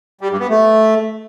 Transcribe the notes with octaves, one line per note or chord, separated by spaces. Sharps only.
G3
G2
B3
A3